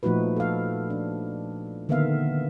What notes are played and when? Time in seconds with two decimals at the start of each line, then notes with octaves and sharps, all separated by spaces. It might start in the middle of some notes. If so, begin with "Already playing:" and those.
0.03 A#2 F3 A3 D#4 F#4 B4
0.36 A4 F5
0.90 D4
1.89 D3 D#3 A#3 B3 E5 F5